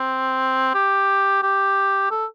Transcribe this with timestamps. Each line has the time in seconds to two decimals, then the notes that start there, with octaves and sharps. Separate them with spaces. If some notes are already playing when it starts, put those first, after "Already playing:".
Already playing: C4
0.74 G4
1.43 G4
2.11 A4